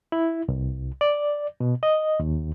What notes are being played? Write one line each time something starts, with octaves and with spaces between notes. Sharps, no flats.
E4
C2
D5
B2
D#5
D#2